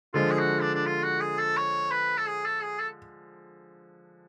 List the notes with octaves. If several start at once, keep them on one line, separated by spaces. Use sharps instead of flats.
D3 F3 G#3 F4
G#4
F#4
D4
D4
F4
F#4
G#4
A4
C#5
B4
A4
G#4
A4
G#4
A4